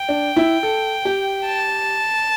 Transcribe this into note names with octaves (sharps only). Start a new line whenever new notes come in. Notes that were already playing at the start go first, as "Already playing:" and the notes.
Already playing: G5
D4
E4
A4
G4
A5